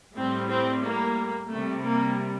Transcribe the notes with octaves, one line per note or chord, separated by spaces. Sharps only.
A2 G3 C4
C4
A#3
C3 G3 A3
A#3